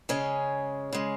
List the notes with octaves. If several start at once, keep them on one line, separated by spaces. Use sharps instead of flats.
C#3 G#3 C#4
C#3 G#3